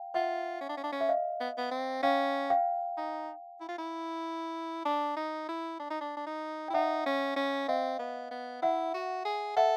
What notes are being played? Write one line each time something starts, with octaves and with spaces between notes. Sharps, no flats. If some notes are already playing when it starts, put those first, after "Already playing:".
Already playing: F5 G5
F4 E5 F#5
C#4
D4
C#4
D4
C#4
E5
D#5 F5
B3
B3
C4
C#4 F5 G5
F5 G5
D#4
E4
F4
E4
D4
D#4
E4
D4
D#4
D4
D4
D#4
E4 G5
D#4 E5 F#5
C#4
C#4
C4 D#5 F5
B3
B3
E4 E5 F#5
F#4
G#4
A4 E5 F#5